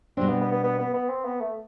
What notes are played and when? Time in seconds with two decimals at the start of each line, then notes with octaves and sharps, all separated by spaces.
0.17 B2 G3 C4 D4
0.29 B3
0.41 B3
0.51 B3
0.64 B3
0.79 B3
0.94 B3
1.10 C4
1.25 B3
1.40 A3